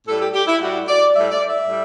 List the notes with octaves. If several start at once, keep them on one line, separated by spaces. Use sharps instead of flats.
A2 G3 A4
G4
G4
E4
A2 G3 F#4
D5
A2 G3 E5
D5
E5
A2 G3